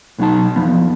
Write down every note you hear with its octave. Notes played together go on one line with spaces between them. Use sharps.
B1 D3 F#3 D#4 A5
F2 F3 B3